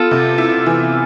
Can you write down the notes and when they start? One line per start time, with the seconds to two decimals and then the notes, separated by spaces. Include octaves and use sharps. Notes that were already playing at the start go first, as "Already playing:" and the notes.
Already playing: B3 F4 A4
0.11 C3
0.38 E4
0.66 E3